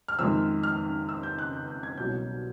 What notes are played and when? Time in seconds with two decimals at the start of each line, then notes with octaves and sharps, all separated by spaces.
0.08 F6
0.19 F2 C3 D#3 G#3 E6
0.63 F6
1.09 E6
1.23 G6
1.39 F#6
1.53 G6
1.68 G6
1.83 G#6
1.98 C2 B2 F#3 G6